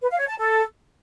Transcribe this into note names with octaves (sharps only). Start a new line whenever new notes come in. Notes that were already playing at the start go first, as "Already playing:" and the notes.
B4
F5
C#5
A5
A4